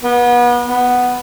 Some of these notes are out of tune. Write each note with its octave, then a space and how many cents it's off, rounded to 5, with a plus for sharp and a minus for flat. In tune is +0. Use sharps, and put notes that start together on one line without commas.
B3 -30
B3 +0